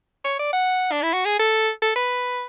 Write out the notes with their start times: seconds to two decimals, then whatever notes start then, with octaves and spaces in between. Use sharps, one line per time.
0.25 C#5
0.39 D5
0.53 F#5
0.92 D4
1.02 E4
1.14 F#4
1.25 G#4
1.40 A4
1.82 A4
1.96 B4